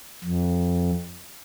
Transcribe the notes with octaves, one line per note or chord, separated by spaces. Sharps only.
F2